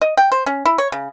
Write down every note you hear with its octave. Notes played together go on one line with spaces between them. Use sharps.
D#5
G5
C5
C#4
E4
C#5
C#3